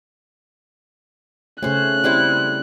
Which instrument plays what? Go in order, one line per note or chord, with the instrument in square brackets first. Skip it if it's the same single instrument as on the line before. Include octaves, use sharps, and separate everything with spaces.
[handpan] C#3 A3 [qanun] C#4 C5 [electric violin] F#6
[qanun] G3 C4 E4